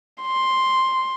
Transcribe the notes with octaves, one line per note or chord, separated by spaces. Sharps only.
C6